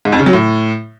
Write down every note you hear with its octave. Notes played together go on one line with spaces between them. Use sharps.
G#2
F2
C#3
F#3
A2